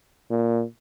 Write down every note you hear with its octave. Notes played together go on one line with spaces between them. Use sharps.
A#2